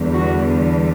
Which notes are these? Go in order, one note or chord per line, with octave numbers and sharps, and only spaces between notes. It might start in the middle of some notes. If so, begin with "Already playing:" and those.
Already playing: E2 D3 G3
F#4